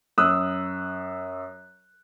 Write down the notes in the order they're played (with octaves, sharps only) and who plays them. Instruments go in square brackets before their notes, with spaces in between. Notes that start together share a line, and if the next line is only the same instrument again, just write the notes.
[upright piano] F#2 D#6 E6 F#6